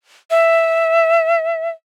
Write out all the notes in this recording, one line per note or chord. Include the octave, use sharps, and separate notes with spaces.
E5